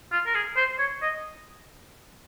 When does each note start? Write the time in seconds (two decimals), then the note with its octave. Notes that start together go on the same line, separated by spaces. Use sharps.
0.12 F4
0.26 A#4
0.35 G#4
0.56 C5
0.79 C#5
1.02 D#5